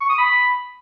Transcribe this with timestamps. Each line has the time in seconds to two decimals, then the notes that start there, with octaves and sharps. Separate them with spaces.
0.01 C#6
0.10 D#6
0.18 B5